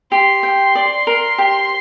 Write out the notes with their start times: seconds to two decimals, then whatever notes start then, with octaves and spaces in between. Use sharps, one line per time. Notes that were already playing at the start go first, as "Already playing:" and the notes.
0.11 G4 C6
0.43 G5
0.75 D5
1.07 A#4
1.38 G4